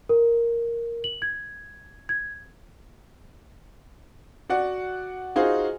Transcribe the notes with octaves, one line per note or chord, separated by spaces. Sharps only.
A#4
F#7
G#6
G#6
F#4 D5 F#5
D#4 F4 F#4 G#4 C5